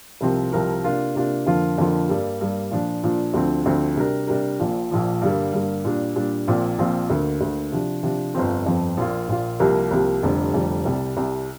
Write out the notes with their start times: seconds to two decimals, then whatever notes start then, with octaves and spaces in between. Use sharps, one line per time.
0.21 C2 C3 F3 C4 A#4
0.52 C2 C3 F3 C4 A#4
0.84 C3 A#3 D4 F4
1.15 C3 A#3 D4 F4
1.46 F2 D3 F3 A#3 F4
1.78 F2 D3 F3 A#3 F4
2.09 G2 G3 A#3
2.41 G2 G3 A#3
2.71 A#2 F3 D4
3.03 A#2 F3 D4
3.34 D2 D3 F3 C4
3.65 D2 D3 F3 C4
3.96 C3 G3 D4 G4 A#4
4.27 C3 G3 D4 G4 A#4
4.60 A#1 A#2 F3
4.91 A#1 A#2 F3
5.22 G2 D3 G3 A#3
5.53 G2 D3 G3 A#3
5.85 A#2 G3 D4
6.15 A#2 G3 D4
6.47 A#1 A#2 F3 C4 F4
6.78 A#1 A#2 F3 C4 F4
7.10 D2 D3 A#3
7.41 D2 D3 A#3
7.72 C3 F3 D4
8.03 C3 F3 D4
8.34 G1 F2 F3 C4
8.66 G1 F2 F3 C4
8.97 A#1 A#2 A#3 F4
9.28 A#1 A#2 A#3 F4
9.59 C2 C3 F3 A#3 G4
9.91 C2 C3 F3 A#3 G4
10.23 F1 F2 D3 G3
10.54 F1 F2 D3 G3
10.85 C2 C3 G3
11.17 C2 C3 G3